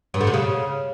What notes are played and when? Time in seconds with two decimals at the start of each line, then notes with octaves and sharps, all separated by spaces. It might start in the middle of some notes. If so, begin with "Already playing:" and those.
0.14 G2
0.21 D3
0.27 C3
0.34 C#3